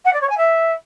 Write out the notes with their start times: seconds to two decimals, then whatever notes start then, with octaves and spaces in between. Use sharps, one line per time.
0.05 F#5
0.13 D5
0.21 C#5
0.29 G#5
0.37 E5